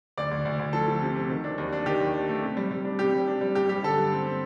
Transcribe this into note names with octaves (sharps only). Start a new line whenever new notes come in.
D2 D5
D2
D2
D2
F3 A4
F3
C3
C3
D#3
D4
D#2
D4
D#3 G4
D#2
D4
A3
C3
G3
G3
D4
C3 G4
G3
D4
G3
G2 G4
G3 G4
D3 A4
G2
C4
C4